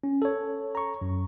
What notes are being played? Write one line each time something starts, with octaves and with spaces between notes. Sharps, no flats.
C#4
A4 C#5
A#5 C#6
F#2